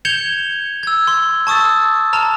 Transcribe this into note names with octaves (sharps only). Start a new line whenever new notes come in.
G6 G#6 C#7 E7 F7 G7
E6 G#6
C6
A5 C#6 D#6 E6 A6
A5 A#5 F6